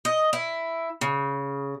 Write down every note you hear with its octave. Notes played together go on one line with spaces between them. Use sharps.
D#5
E4
C#3